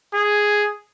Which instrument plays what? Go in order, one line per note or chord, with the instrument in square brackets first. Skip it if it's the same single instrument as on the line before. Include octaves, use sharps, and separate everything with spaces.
[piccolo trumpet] G#4